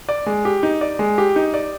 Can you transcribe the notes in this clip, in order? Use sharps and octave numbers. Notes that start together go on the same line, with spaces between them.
D5
G#3
G4
D#4
D5
G#3
G4
D#4
D5